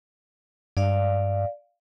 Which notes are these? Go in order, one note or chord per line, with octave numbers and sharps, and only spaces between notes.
G2 D5 F5